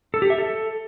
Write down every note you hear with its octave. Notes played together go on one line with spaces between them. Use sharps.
A4
G4
E5
A4